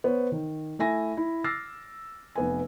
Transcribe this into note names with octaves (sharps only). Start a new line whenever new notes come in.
B3 C5 C#5
D#3
A3 E4 E5 G#5 A#6
E4
D6 E6 F6 A6 A#6 C7
F1 B3 G#5